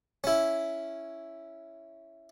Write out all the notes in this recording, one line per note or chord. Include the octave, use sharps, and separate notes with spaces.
C#4 E4